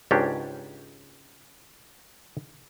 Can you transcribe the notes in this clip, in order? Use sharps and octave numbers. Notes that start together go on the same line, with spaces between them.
C#2 G#2 C#4 D4 G4